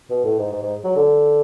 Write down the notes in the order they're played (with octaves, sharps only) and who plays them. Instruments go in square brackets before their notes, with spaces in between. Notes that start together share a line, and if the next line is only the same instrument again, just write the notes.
[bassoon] B2
A2
G#2
G#2
G#2
F#3
D3